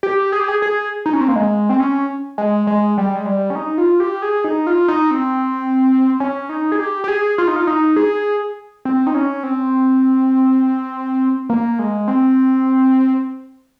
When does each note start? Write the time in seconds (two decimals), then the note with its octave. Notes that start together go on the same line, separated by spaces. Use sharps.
0.03 G4
0.32 G#4
0.40 G4
0.48 G#4
0.62 G#4
1.06 D#4
1.13 C#4
1.21 C4
1.28 A#3
1.36 G#3
1.69 C4
1.80 C#4
2.38 G#3
2.67 G#3
2.98 G3
3.15 G#3
3.26 G3
3.50 C#4
3.55 D#4
3.78 F4
4.00 G4
4.22 G#4
4.44 D#4
4.67 F4
4.88 D#4
5.11 C4
6.20 C#4
6.49 D#4
6.72 G#4
6.79 G4
7.04 G4
7.08 G#4
7.38 F4
7.48 D#4
7.56 F4
7.67 D#4
7.96 G#4
8.85 C4
9.07 D#4
9.15 C#4
9.43 C4
11.50 A#3
11.79 G#3
12.08 C4